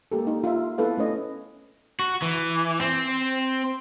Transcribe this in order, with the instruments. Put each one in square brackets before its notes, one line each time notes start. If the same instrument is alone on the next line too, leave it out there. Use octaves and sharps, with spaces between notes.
[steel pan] G#3 A#3 G4 A4
D#4
F4 E5
B3 E4 A4 B4 F5
A3 C#4 C#5 D#5
[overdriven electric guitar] F#4
E3
C4